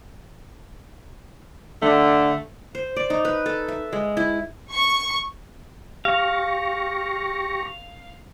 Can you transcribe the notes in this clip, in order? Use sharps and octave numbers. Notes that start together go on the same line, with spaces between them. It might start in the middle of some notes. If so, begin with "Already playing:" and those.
D3 A3
C5
D5
D#4
B4
A4
E5
G#3
E4
C#6
G4 F5 C#6 A#6